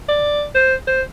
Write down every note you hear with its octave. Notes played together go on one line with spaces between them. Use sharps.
D5
C5
C5